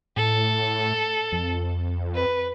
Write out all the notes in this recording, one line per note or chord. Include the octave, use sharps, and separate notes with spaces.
A2 A4
F2
B4